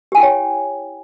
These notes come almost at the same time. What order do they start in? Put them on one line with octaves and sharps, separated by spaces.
G4 G#5 E4 G5 C#5